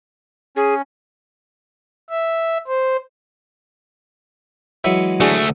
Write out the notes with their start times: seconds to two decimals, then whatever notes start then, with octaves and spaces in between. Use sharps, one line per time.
0.56 C#4 G#4
2.10 E5
2.67 C5
4.84 E3 F#3 G#3 E5 C#7
5.20 D2 A3 D4 F#4 G#4